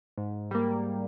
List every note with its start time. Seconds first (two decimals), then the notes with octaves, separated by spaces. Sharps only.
0.18 G#2
0.51 G3 A#3